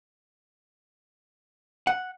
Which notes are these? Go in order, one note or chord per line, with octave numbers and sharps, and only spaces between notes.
F#5